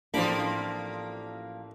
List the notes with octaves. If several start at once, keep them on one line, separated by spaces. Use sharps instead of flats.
A1 F3 A#3 C4 D4 B5 D6